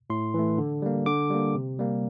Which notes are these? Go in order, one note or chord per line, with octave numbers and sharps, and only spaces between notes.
A2 C6
E3 A3
D3
G3 A#3
D3 D6
G3 A#3
C3
G3 A#3